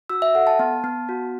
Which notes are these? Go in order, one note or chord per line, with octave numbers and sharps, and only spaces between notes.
F#4 E6
E5
A4 F#5
A5
B3
B3
F#4